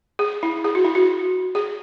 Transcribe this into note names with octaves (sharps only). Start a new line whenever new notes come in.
G#4
E4
G#4
F#4
E4
F#4
G#4